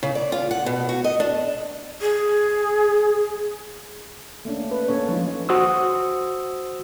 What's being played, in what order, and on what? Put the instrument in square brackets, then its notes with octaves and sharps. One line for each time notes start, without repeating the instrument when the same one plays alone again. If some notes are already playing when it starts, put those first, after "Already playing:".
[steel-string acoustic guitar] C#3
D5
F4
F#5
B2
F#4
D#5
D4
[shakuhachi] G#4
[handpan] A3 A#3 C#4 D4
B4
A#3 C#4 A4 C#5
F3 G#3 D#4 F4
[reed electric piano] F#4 C5 D#6 E6